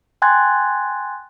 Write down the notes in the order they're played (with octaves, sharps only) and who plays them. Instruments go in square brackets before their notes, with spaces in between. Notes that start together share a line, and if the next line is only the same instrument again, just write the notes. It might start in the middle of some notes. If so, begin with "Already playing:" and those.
[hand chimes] G5 G#5 C6 F#6 G#6 A6